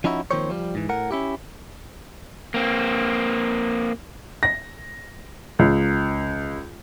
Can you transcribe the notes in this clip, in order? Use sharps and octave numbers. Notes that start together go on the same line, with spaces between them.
F3 C#4 D#4 E4 F#4
D#3 F3 A#3 C4 C5 C#5
F3 G3
G#2 E3
A2 A#4 F#5
C#4 E4 G4
A#3 C4
A#6
C#2